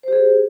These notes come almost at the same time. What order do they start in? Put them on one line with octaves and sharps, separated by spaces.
C5 G4 G#4